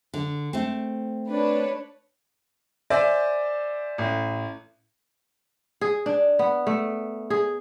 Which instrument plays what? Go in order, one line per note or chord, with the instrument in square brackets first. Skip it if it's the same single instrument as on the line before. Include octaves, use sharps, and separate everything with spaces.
[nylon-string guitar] D3
A3 C4
[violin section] D4 B4 C#5
[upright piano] C5 D5 E5 G#5 D6
A1
[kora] G#4
D4
B3
A3
G#4